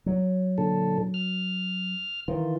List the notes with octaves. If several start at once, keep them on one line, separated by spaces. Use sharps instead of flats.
F#3
A#2 D3 A4
F6
D#3 E3 F4